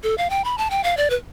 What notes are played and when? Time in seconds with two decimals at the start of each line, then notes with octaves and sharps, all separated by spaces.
0.03 A4
0.18 F5
0.30 G5
0.44 B5
0.58 A5
0.70 G5
0.84 F5
0.97 D5
1.10 B4